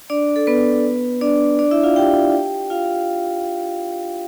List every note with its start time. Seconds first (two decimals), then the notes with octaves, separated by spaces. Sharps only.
0.10 D4 D5
0.36 A4
0.47 B3 B4
1.21 D4 D5
1.59 D4 D5
1.71 E4 E5
1.83 F4 F5
1.96 G4 G5
2.70 F4 F5